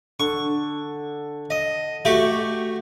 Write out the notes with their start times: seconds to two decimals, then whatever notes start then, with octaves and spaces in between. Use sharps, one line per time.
0.20 D3 C#6
1.50 D#5
2.05 A3 F#4 G4